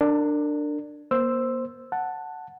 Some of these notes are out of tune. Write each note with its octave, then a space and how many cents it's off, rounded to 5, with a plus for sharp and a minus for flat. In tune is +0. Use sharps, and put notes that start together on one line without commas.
D4 +10 A#4 -30
A#3 +35 C5 +0 E6 +0
F#5 +0 A5 +5